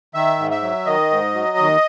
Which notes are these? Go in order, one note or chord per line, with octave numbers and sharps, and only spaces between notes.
D#3 E5
G#2
E5
F#3
D#3 D#5
G#2
F#3
D#2